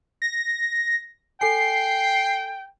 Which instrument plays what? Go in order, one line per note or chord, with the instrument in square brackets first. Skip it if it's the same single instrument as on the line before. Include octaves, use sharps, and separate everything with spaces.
[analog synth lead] A#6
[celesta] A4 G#5 [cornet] G5 [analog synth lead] C7